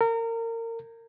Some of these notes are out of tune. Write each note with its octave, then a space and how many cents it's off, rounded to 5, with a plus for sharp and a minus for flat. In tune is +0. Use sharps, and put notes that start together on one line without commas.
A#4 -30